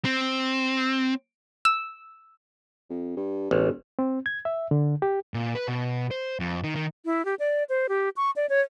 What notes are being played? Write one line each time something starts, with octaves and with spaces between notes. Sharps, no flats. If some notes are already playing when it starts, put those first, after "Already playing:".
C4
E6
F2
G2
E1 A1
C4
G#6
E5
D3
G4
A#2
B4
B2
C5
F2
D#3
D#3
E4
G4
D5
C5
G4
C#6
D5
C#5